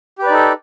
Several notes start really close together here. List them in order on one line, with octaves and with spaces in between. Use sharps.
G4 B4 D5 D#4 A4